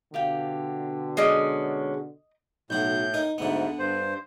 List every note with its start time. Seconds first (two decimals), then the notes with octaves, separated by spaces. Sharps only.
0.14 B2 D3 G4 F5 G5
1.17 G#3 C#4 D5 D#5 D#6
2.70 B1 A2 F#4 G6
3.14 D#4 A#4
3.38 D2 G#2 D3 B3
3.79 G2 C5